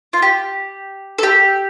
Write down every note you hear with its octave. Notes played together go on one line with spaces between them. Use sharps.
F4
G4
A4
G4